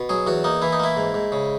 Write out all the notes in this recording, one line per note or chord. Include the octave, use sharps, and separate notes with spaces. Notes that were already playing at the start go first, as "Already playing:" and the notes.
Already playing: B2
F#3 G#4
E2 F#4
A#3 D#4
E3 E4
D#4
A#3 E4
G#2
G#2
C#3